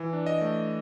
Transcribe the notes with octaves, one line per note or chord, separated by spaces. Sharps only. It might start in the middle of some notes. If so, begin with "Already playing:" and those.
Already playing: E3
D4
D#5
A3